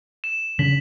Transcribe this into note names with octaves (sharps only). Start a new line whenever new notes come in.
E7
C#3 D4 B6 F#7